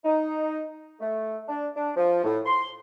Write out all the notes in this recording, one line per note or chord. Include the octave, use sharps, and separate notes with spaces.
D#4
A3
D4
D4
F3
A2
C6